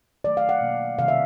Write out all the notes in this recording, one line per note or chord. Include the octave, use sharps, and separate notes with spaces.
D#3 F#3 A3 D5
F5
F#5
B2 F#3 A#3
C3 D#3 G3 F5
E5